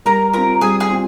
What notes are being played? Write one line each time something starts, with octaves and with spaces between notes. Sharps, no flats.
G3 A#4 A#5
C4 F4 A#4 A#5
G3 G#4 G#5
G#4 G#5
C4 F4